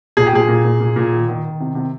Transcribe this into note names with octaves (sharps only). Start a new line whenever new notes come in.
A#2 G#4
G4
A#2 G#4
A#2
A#2
A#2
A#2
D#3
D#3
D#3
C3
C3